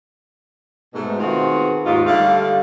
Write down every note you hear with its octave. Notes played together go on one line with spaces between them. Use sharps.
G#2 B2 A3
D#3 C4 F4 F#4 G#4 B4
D#2 G#2 F4
D3 G3 A3 F5